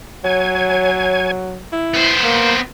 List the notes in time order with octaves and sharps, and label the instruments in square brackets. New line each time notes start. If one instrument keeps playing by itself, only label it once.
[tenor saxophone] F#3 [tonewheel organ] C#5 G#5
[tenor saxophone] E4
[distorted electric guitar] B3 C5 [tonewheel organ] B5 G6
[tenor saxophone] A#3